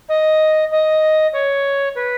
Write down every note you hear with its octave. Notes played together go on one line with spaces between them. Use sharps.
D#5
D#5
C#5
B4